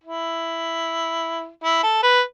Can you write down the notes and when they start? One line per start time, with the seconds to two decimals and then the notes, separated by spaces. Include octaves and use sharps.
0.04 E4
1.63 E4
1.83 A4
2.03 B4